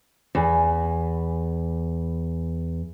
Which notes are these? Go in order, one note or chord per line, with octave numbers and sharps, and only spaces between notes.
E2 G#5 B5